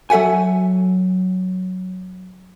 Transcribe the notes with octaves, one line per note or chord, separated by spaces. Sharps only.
F#3 A4 E5 F#5 G#5